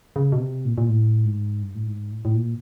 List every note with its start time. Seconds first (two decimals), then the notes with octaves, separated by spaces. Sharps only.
0.16 C#3
0.32 B2
0.39 C3
0.65 A#2
0.78 A#2
0.88 A2
1.25 G#2
1.62 G2
1.75 A2
1.87 G#2
2.11 A2
2.25 A2
2.35 A#2